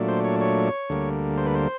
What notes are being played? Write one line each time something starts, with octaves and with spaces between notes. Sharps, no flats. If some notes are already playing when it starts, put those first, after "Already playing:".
Already playing: A#2 F#3 A3 D4
C5
C#5
C#5
D2 D3 G3 A#3
C5
B4
C5